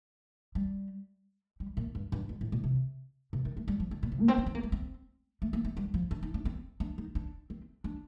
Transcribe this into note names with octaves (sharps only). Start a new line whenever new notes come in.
G3
G3
A#2
G2
G2
F2
A2
A#2
C3
C3
D#3
A3
G3
F3
D3
A#2
C3
A#3
C4
D4
C4
A#3
A3
C4
A3
A#3
A3
G3
F3
D4
D#4
D4
C4
D4
D#4
D4
C4
D4